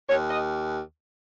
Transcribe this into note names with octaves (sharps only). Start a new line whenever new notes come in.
D#2 C#5
D#5